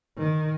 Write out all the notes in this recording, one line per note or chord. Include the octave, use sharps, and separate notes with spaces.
D#3